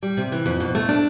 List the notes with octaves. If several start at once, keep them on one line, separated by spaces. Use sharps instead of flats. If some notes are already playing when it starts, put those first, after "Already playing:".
G3
C3
E3
F2
B2
A3
D4